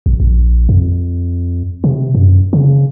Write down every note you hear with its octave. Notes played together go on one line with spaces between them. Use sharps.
A#1
A#1
F2
C3
F#2
C#3